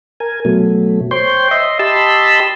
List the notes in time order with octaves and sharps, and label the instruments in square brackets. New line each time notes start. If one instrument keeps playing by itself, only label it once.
[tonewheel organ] A#4 G#5
B2 F#3 A3
C5 C#5 G5 C6
D#5 E5 C6
G4 D#5 A5 B5 C6 E6